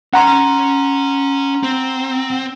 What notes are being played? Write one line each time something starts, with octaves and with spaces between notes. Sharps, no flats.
C#4 F#5 G#5 A#5 C6
C4